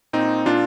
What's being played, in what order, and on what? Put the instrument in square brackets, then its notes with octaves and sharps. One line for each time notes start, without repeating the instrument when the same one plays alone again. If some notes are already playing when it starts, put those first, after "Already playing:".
[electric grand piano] A#2 C4 D#4
A#2 D4 F4